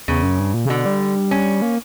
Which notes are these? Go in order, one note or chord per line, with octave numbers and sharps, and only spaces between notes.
E2 C#3
F#2
G2
A#2
C#3
B2 D3
G3
C#4
A#3